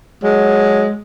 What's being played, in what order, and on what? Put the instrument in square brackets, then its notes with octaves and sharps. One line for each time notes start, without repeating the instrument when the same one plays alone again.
[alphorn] F#3 [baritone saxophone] G#3